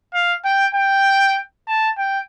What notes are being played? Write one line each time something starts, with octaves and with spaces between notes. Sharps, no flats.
F5
G5
G5
A5
G5